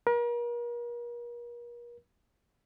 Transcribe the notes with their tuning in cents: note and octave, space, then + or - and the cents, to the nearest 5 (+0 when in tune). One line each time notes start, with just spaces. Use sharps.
A#4 +40